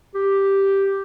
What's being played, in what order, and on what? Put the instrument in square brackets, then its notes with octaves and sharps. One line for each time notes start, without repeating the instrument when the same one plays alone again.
[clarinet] G4